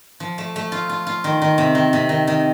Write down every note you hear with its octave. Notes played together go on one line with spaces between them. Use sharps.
F3
A3
A3
F4
F4
F4
D#3
D#3
C3
D#3
C3
D#3
D#3